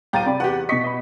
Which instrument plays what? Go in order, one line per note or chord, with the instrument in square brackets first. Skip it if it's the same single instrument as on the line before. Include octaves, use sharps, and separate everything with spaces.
[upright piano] D#1 A6 D#7 [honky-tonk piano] F5 G5 A#5
[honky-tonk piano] C3 [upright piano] D5 B5
[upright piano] E2 G4 [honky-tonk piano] F#5
[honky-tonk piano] B2 B6 [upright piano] D#5 C#6 C#7
[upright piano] D#5 B5